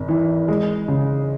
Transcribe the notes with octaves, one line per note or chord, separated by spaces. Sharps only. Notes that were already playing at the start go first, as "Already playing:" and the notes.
Already playing: G#1
E3
G#3
C#3